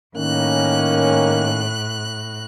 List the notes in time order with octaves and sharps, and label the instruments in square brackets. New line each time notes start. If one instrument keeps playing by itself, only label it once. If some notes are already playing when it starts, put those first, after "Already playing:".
[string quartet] A2 F#6 [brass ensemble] D#3 A#3 C#4